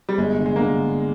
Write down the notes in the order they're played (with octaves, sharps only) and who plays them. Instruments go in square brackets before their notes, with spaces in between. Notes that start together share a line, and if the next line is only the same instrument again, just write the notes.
[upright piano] G3
[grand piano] G1 [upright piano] G#3
[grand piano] D3
[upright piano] G#3
A#3
[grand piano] D3